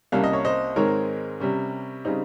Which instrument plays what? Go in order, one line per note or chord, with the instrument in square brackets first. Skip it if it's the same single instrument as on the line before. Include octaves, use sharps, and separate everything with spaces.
[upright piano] C2 C3 G3 A#3 C#4 F5
D#5
C#5
C5 D#5
G#2 D#3 G#3 C4 D#4 A#4 C#5
C3 G3 C#4
C#3 G3 C4 D#4